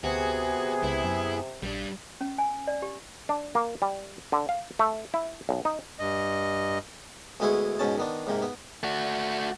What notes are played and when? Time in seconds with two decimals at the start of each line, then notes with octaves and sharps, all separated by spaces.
0.04 D2 C3 B3 F#4 G#4
0.83 C#2 E4
1.04 F#2
1.62 A#1 G3 D4
2.21 C#4
2.38 G#5
2.67 D5
2.82 G4
3.29 D4
3.55 A#3
3.82 G3
4.32 D3
4.49 F5
4.79 A3
5.14 E4
5.49 B1
5.65 D#4
5.99 G2 D#5
7.40 D2 G#3 B3 E4 G#4 C#6
7.79 G#2 B2 C#4 A5
7.98 D#3 B3 D4
8.27 G#2 C3 A#3
8.42 B3
8.83 A3 F#4